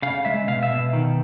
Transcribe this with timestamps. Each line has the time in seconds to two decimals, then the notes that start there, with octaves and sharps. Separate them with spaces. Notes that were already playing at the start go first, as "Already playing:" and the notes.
0.02 C#3 F5
0.25 G#3 E5
0.47 B2 F5
0.63 E5
0.71 B2
0.93 D#3